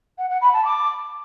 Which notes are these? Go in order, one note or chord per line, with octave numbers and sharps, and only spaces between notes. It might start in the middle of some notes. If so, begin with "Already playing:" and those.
F#5
F#5
B5
A5
D6